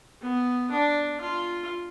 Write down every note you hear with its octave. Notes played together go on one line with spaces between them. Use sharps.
B3
D4
F4